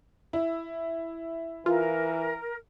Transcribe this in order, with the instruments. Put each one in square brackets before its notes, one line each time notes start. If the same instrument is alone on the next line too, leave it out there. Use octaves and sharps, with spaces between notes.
[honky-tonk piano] E4
[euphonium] E3 [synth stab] F4 [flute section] A#4